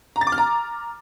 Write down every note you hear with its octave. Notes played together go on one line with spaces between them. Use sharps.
A#5
A6
D6
F6
A#5